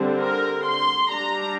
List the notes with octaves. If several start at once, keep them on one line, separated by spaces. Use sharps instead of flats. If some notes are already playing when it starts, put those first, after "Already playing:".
Already playing: D3 G3 C4
A#4
C6
G3 D4 A#5